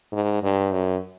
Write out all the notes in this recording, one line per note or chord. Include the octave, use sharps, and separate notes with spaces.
G#2
G2
F#2